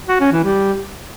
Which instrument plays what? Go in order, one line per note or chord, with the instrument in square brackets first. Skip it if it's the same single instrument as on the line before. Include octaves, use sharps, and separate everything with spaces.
[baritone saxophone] F#4
C#4
E3
G3